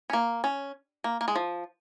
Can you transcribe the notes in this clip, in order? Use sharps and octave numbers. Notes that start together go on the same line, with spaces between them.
C#4
A#3
C#4
A#3
A#3
G#3
F3